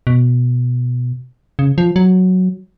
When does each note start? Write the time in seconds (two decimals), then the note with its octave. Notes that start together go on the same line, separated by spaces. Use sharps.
0.07 B2
1.59 C#3
1.78 F3
1.96 F#3